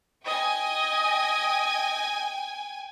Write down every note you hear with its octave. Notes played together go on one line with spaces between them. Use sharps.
D#5 G5 G#5